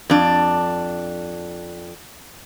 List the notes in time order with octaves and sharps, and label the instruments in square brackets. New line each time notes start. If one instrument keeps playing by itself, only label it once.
[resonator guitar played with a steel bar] F2 D4